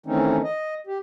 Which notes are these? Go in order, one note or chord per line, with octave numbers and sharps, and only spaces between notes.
D#3 E3 A3 C4 C#4 D#4
D#5
G4